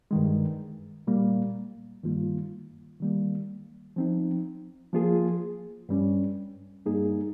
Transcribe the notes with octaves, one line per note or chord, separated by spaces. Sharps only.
G2 D#3 G#3
A#2 G3 A#3
G2 D#3 G3 A#3 F4
D#3 G3 A#3
F3 C4 D#4
F3 A#3 F4 G#4
G2 G3 C#4
G2 G3 A#3 D#4 G#4